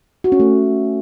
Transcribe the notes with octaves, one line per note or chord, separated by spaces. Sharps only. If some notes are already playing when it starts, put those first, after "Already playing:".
F#4
C#4
A3